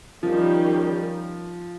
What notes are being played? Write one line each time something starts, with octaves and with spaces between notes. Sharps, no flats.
D#3 F3 G3 C#4 G4